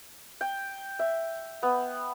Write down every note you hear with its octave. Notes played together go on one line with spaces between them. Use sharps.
G5
E5
B3